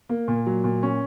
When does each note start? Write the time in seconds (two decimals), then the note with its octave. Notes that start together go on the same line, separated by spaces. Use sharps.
0.09 A#3
0.28 A#2
0.46 F#3
0.64 A#2
0.83 C#4